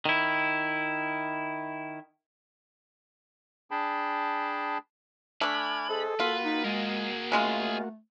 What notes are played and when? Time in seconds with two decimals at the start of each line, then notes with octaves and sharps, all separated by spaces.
0.05 D#3 E4
3.71 D4 G#4 G5 A5 B5
5.41 A3 D4 G#5 B5 D6 F6
5.89 G#4 A4 C5 D#5
6.20 A#3 F4 F#4 B4
6.45 D#4
6.64 G#3 G#4 A#4
7.32 C#3 G#3 A3 F4